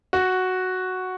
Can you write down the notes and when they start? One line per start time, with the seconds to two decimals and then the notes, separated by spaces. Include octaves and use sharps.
0.13 F#4